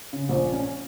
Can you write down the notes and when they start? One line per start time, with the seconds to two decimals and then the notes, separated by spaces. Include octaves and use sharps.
0.13 C#3
0.29 A#1
0.52 C#4